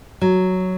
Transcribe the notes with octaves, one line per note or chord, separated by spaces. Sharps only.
F#3